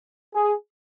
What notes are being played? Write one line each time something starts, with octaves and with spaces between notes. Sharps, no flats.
G#4